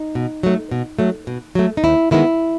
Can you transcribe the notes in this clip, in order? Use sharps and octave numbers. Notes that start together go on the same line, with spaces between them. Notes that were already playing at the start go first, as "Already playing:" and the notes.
Already playing: D#4
B2
F#3 A3
B2
F#3 A3
B2
F#3 A3
D#4
D#2 E4
D#3 G#3 B3 E4